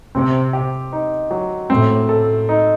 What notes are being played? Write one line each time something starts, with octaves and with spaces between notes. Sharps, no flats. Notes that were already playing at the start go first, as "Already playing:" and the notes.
C3 C4
G4
D#4
F#3
A2 C4
A4
D#4